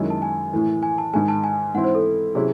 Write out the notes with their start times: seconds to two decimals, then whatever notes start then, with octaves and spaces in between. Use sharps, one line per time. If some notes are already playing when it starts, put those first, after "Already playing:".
Already playing: F#2 D#3 G#3 C#4 E4
0.10 A5
0.22 G#5
0.53 A2 E3 A3
0.82 G#5
0.98 A5
1.13 G#2 D#3 G#3 G#5
1.28 A5
1.44 G#5
1.74 G#2 E3 C4 E4 F#5
1.84 C5
1.95 A4
2.35 C3 F#3 C#4 E4 G#4